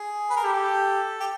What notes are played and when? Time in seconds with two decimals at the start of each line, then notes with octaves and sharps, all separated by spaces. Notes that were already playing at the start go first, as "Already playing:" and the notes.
Already playing: G#4
0.30 B4
0.36 A#4
0.44 G4 A4
1.20 G4